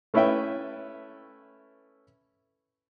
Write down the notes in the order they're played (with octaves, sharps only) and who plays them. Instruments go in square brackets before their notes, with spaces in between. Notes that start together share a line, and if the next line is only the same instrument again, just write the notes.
[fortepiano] A3 C#4 E4 B4 E5 G5